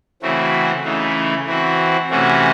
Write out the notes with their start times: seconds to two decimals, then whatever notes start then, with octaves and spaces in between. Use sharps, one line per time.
0.22 C#3 E3 A3 C4 F#4
0.85 C#3 E3 A3 D#4
1.46 E3 C4 F#4
2.10 C3 E3 A3 C#4 F#4